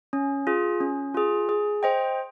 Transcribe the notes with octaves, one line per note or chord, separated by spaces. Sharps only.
C#4
F4 G#4
C#4
F4 G#4
G#4
C5 D#5 G5